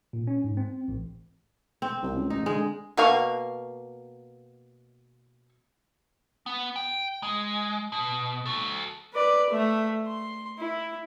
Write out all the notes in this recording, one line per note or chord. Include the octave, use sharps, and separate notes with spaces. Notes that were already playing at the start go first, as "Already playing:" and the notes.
A#2
C#4
G#2
C4
A1
C4
C2
C#2
A1 D#4
D3 G#3
B2 A#3 F5 C#6
B3
G5
G#3
B2
F#4 A4
B4 D5
A3 E5
C6
E4